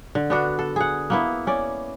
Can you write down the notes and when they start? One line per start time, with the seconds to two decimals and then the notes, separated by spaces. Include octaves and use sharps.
0.15 D3
0.30 B3 D4 F#4
0.59 A4
0.76 G#4 F#5
1.10 A#3 B3 E4
1.47 C#4 D5